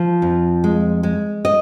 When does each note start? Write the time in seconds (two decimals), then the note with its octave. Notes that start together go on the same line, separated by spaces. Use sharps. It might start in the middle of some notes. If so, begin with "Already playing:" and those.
Already playing: F3
0.22 F2
0.64 G#3
1.03 G#3
1.45 D#5